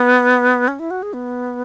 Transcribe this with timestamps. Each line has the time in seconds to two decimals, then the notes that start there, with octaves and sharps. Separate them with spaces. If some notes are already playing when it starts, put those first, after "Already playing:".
Already playing: B3
0.68 C#4
0.79 E4
0.91 F#4
1.03 G#4
1.13 B3